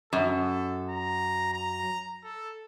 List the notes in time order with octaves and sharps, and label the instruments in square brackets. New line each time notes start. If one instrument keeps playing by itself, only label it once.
[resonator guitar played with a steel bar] F#2 [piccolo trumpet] A4
[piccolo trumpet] A#5
A#5
A4